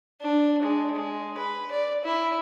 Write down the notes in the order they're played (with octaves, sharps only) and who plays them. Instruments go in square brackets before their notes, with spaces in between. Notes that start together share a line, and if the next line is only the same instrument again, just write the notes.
[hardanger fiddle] D4
G#3
G#3
B4
D5
E4